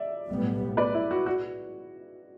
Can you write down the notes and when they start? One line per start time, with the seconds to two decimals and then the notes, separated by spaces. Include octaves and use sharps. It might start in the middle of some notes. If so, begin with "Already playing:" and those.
Already playing: D5 E5
0.29 B1 A2 G3 B3
0.77 B4 D5
0.94 E4
1.11 F#4
1.26 F#4